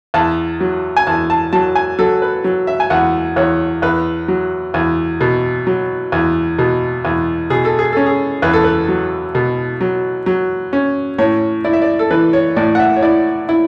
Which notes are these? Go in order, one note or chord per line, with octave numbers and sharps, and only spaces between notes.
E2 A5
F#3
G#5
E2 A5
A5
F#3 A5
G#5
F#3 A4
B4
F#3
E5
G#5
E2 F#5
E2 C#5
E2 B4
F#3
E2
B2
F#3
E2
B2
E2
B2 G#4
A4
G#4
C#4 A4
G#4
E2 B4
A4
B4
F#3
B2
F#3
F#3
C#4
A2 C#5
E4 D5
E5
D5
A4
E3 B4
C#5
A2 D5
F#5
E5
C#5
E4 D5
E4